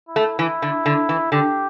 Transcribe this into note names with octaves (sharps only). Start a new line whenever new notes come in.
E4
A3
E3 E4
D3
D3
E3
D3 G4